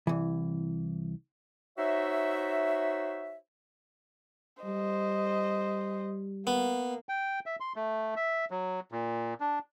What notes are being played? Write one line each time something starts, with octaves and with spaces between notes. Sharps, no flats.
C2 E3
D#4 F#4 C5 C#5 E5
G3 C5 D#5
A#3 B3
G5
E5
C6
A3
E5
F#3
A#2
D4